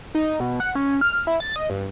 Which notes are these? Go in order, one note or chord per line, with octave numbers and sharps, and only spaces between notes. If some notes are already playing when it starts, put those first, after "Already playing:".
D#4
B2
F#5
C#4
F6
E4
A6
D#5
G2